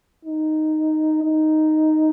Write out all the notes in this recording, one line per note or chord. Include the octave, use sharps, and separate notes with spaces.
D#4
D#4